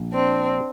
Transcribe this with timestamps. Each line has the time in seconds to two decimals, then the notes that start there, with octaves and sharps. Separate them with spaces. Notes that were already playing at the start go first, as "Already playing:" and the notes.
Already playing: A#1
0.12 C4 D4